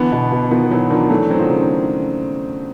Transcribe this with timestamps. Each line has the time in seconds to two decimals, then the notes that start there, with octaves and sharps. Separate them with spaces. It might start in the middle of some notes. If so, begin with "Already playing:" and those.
Already playing: D3 E3 B3
0.12 B2
0.32 B2
0.51 D#3 F3 B3
0.71 E3 F#3 B3
0.90 D#3 F3 D4
1.10 E3 F#3 A3
1.30 F#3 C4
1.39 D#3 F3
1.49 C#3